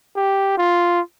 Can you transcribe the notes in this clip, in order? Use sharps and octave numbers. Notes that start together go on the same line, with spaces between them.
G4
F4